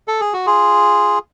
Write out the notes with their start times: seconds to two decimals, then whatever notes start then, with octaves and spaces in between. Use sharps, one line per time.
0.08 A4
0.21 G#4
0.33 F#4
0.46 F4 G#4